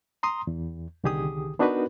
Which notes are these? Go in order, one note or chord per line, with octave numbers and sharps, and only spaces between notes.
A#5 C6 D#6
E2
C2 D3 D#3 G4 G#4 D#6
B3 D4 D#4 F#4 A#4 B4